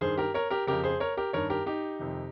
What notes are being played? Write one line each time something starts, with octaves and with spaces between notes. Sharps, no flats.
G2 D#3 G#4 C5
G4 A#4
A#4 C#5
G4 A#4
F2 C#3 G4 A#4
G#4 C5
A#4 C#5
G4 A#4
G2 D#3 A#4 C#5
G4 A#4
D#4 G4
F2 C3 D#3